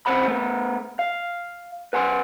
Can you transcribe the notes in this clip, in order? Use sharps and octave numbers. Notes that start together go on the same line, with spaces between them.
E3 G3 C4 C5 F#5 B5
A3 B3
F5
B4 F#5 G#5 C6